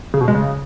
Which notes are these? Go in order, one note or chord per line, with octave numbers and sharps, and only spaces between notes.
C#3
B2
G#3
C#3